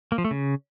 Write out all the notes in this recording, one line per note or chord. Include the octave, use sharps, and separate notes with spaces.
A#3
F3
A3
C#3